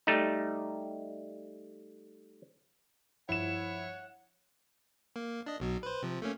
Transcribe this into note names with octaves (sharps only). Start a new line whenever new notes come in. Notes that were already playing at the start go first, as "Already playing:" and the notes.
G3 A3 D#4
G2 F3 E4 C#5 F#5 E7
A#3
D4 D#5
B1 B2 F#3
B4 C5
C3 F3
A3 A#3 C#4